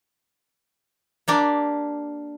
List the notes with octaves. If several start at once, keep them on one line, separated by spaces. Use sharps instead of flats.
A#3 D4 G4